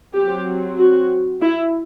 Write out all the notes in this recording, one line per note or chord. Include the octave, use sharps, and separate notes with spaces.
F#3 C4 G4
F#4
E4